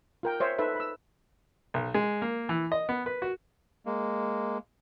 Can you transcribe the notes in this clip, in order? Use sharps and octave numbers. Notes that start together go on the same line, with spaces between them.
F4 A#4 G5
C5 C#5 E5
D#4 A4 B4 E5
B5 E6
B1
G#3
A#3
E3
D#5
B3
B4
F#4
G#3 A#3